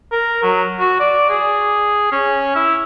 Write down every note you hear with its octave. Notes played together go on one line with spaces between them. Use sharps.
A#4
F#3
F#4
D5
G#4
C#4
E4